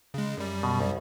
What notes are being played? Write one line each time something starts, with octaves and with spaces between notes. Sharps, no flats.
C#3 G#3
F#2 G3
B2
C2